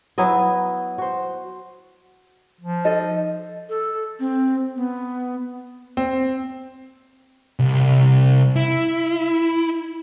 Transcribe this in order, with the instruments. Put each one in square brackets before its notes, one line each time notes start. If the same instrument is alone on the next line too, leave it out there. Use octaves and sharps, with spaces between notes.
[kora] F#3 B3 E4 D#5
F#4 C5
[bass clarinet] F3
[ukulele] D#4 A4 D#5
[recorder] A4
C4
B3
[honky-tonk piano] C4
[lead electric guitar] C2
E4